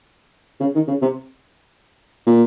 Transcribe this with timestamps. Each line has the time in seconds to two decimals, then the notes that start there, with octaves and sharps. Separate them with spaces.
0.60 C#3
0.75 D#3
0.88 C#3
1.01 C3
2.26 A#2